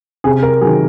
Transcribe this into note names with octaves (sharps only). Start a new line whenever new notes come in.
C3 G#4
A#4
D#3 F#3 G#4